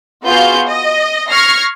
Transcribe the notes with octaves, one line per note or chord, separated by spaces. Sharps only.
B3 F4 F#4 G#4 F5 G6
D#5
C#6 F6 G#6 A#6 C7 C#7